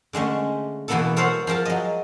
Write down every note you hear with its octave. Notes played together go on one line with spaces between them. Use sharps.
D3 G#3 A3 C#4
B2 E3 A#3 B3 E4 A4
A4 A#4 C5 C#5 F5 F#5
F3 G#4 A#4 A5
F#3 D#5